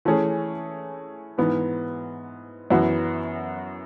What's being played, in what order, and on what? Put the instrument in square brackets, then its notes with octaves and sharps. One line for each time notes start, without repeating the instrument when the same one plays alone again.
[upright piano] E3 A3 C#4 G#4
G#2 E3 B3
F#2 E3 B3 F#4